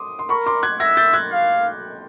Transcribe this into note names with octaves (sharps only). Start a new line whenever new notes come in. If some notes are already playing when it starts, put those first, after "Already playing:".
Already playing: C6 D6 D#6
C6
A#4 B5 C#6
C6 D6
F#6 G#6
E5 G#6 A#6
G6 A6
F#6 G#6
F5